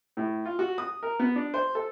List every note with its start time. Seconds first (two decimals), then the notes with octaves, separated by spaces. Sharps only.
0.17 A2
0.45 F4
0.59 F#4
0.78 D#6
1.03 A#4
1.19 B3
1.36 D4
1.54 C5
1.75 A4